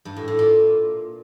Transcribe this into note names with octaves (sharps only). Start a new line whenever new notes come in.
G2
A2
A2
A#2